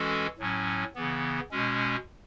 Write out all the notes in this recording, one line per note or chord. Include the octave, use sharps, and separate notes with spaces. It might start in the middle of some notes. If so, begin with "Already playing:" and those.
Already playing: E3 G#3 C#4 F#4 A4
A2 F#3 C#4
C#3 E3 B3
B2 G#3 C#4